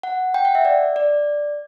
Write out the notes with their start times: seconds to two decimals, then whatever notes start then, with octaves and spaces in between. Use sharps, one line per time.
0.03 F#5
0.34 G5
0.45 F#5
0.55 E5
0.65 D5
0.96 D5